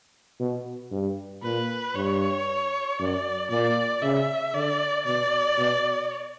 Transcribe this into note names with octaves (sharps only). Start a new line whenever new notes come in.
B2
G2
A#2 B4
G2 C#5
F#2 D5
A#2 D5
C#3 E5
D3 D5
B2 D5
B2